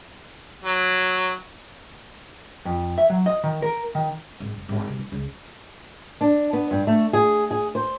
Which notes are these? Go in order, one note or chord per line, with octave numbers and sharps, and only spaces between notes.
F#3
F2
E5
F#3
D#5
D#3
A#4
D#3
G#1
F1
G#1
C2
E3
C#2
D4
B3
G2
A3
G#4
G#4
C5